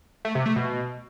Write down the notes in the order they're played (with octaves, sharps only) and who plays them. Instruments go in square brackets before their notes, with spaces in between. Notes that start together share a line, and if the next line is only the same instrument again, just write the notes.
[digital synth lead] A3
C3
A3
B2